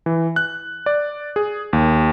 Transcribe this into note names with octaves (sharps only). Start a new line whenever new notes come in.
E3
F#6
D5
G#4
D#2